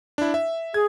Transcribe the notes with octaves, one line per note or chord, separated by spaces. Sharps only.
D4 E4
E5
G#4 G#6